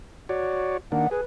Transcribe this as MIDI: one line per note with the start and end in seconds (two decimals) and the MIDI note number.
0.29 0.77 66
0.29 0.77 73
0.29 0.77 74
0.92 1.07 51
0.92 1.07 58
0.92 1.07 62
0.92 1.11 78
1.11 1.21 68
1.11 1.23 71